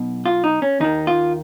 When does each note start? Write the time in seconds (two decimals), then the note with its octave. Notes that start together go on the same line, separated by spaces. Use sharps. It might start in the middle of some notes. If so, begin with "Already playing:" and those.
Already playing: B1 B2
0.26 F4
0.44 D#4
0.62 C#4
0.80 D#2 D#3 D#4
1.07 F4